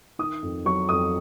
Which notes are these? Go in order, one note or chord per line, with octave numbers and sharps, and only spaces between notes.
D#3 D#6
F2
F#3 C#6
F2 D#6